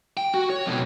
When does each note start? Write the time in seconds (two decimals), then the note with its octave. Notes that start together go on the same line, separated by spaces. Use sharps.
0.17 G5
0.34 F#4
0.50 C#5
0.66 F2 B2